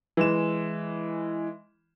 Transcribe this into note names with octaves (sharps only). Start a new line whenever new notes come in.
E3 G#3 E7